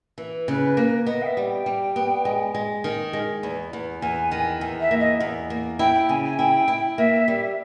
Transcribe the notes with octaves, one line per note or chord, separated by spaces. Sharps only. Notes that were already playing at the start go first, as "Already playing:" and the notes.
E3
C#3 B4
A#3
B3 D#5
G5
E5
G3
G5
G3
B3
G#3
G#3
D#3
G#3
E2
E2
E2 G#5
D#3
E2
E5
A#3
D#5
E2
A#3
E4 G5
G5
C#3 G#5
G#5
E4 G5
E4
A#3 E5
G3